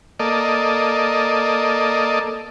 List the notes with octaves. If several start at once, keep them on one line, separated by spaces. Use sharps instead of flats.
A#3 A4 D5 D#5